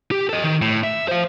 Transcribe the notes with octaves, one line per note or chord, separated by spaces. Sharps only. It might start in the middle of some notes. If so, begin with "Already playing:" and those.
G4
A4 D#5
D#3
A2
E5
C5 F5